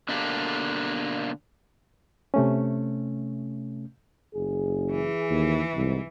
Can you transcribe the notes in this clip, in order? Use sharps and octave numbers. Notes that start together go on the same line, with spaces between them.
B2 D3 A#3 D4 G4
C3 A3 C#4
F#1 G#4
E3
D#2
C2 G#2